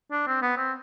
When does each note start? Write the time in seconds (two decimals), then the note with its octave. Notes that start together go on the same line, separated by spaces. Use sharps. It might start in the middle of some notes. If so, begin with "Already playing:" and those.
0.12 D4
0.27 C4
0.42 B3
0.57 C4